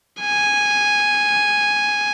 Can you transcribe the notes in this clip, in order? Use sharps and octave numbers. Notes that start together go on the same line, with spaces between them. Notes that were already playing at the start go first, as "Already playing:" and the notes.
G#5